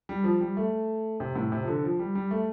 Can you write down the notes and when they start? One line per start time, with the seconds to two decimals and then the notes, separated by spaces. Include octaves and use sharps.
0.09 G3
0.24 F3
0.41 G3
0.57 A3
1.20 C3
1.35 A2
1.52 C3
1.63 F3
1.68 D3
1.84 F3
1.99 G3
2.15 G3
2.31 A3